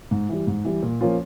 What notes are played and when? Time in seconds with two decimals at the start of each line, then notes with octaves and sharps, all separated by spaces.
0.11 G#2
0.29 E3 G3
0.47 G#2
0.65 E3 G3
0.83 A#2
1.01 F3 A#3 C#4 F4